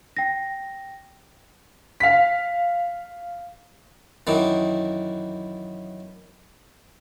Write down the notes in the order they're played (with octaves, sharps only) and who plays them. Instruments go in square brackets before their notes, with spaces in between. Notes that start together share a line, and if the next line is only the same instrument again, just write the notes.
[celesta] G5 A#6
[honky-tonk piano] F5 B6
[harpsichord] F#2 D#3 E3